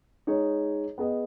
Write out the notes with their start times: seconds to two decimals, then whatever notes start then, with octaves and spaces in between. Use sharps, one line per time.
0.27 G#3 D#4 G#4 C#5
0.98 B3 G#4 B4 D#5